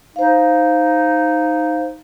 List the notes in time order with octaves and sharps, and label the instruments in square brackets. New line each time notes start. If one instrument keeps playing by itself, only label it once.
[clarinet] D#4 [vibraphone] C5 F5